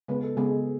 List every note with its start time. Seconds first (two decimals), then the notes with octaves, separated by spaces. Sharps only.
0.08 C#3 G#3 B3 B4
0.23 A4
0.37 C#3 G#3 B3 G#4